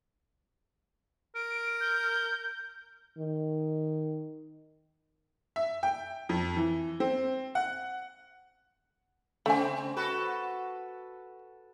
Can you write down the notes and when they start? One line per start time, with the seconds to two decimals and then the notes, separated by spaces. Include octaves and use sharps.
1.35 A#4 D7
1.81 G6
3.18 D#3
5.56 E5
5.83 G5
6.29 F2
6.56 E3
7.00 C4
7.55 F#5
9.46 C#3 A3 C4 G#5
9.96 F#4 A4 B4